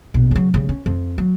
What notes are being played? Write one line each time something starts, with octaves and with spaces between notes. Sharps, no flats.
A#1 B2
C#3 F#3
C#3 G3
C#4
F2
F#3